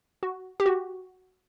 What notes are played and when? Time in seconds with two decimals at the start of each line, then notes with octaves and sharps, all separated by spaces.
0.23 F#4
0.60 G4
0.66 F#4